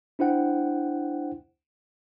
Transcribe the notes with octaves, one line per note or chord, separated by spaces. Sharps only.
D4 E4 C5 F#5 G5